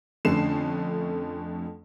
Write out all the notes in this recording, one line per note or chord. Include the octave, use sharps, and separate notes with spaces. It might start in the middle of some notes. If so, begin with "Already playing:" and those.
F2 D3 A3 C#4 C7 E7